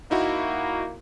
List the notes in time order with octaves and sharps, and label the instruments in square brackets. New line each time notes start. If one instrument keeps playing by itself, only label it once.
[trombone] A#3 [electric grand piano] D#4 E4 F#4